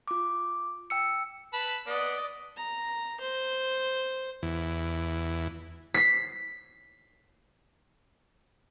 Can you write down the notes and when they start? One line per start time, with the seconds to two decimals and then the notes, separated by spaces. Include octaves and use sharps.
0.08 F4 D6
0.90 G5 E6 C#7
1.53 B4 A5 B5
1.87 B3 D5 D#5
2.57 A#5
3.20 C5
4.43 E2
5.94 B6 C7